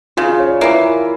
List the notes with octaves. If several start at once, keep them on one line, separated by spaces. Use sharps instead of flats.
C#3 F4 F5
C#5
D5
E3 A#3 E4 E5